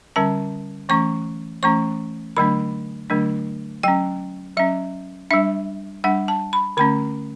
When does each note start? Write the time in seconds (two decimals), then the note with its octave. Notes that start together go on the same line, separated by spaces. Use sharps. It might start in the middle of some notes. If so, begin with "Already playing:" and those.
0.16 D3 G3 C#4 A5
0.89 E3 A3 C#4 C#6
1.63 E3 A3 C#4 C#6
2.37 D3 F#3 A3 D4 B5
3.10 D3 F#3 A3 D4
3.83 F#3 C#4 G5
4.57 F#3 C#4 E5
5.31 G3 D4 E5
6.04 G3 D4 F#5
6.28 A5
6.53 B5
6.77 D3 A3 C#4 B5